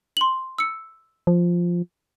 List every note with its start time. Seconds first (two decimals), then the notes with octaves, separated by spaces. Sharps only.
0.17 C6 F#7
0.58 E6 C#7
1.27 F3